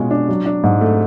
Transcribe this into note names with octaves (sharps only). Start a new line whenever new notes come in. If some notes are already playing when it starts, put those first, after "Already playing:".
Already playing: B2 G#3 C#4 F4
D4
F#3
D4
G#2
A3